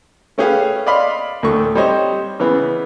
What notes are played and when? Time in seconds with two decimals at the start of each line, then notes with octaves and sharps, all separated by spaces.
0.38 A3 C#4 G4 G#4 B4 F5
0.87 D5 D#5 F5 B5 C6
1.43 D2 A2 A3 C#6
1.75 G3 C4 D#4 C5 C#5 D#5
2.40 C#3 E3 B3